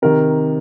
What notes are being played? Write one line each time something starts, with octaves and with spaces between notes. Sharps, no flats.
C3 D#3 A#4